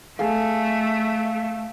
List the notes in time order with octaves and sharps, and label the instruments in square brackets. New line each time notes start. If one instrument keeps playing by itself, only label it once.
[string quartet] A3 [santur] G#4 A4 F5